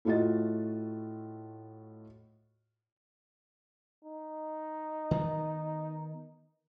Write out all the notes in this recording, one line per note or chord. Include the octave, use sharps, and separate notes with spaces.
A2 A3 F4 F#4 D#5 A6
D#4
D#3 B3